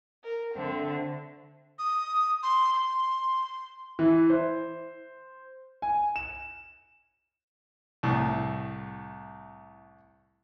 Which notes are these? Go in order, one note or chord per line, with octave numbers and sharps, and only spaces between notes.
A#4
D3 A3 C4
D#6
C6
C6
E3
C5
G#5
E7
C2 A2